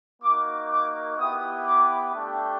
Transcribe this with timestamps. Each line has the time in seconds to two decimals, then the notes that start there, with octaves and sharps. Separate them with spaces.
0.22 A#3 D#4 F#4 D6
0.70 D6
1.17 B3 E4 G4 D#6
1.66 D6
2.12 A3 D4 G4